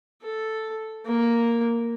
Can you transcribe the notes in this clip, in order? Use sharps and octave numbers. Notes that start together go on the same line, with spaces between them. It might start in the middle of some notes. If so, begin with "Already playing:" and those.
A4
A#3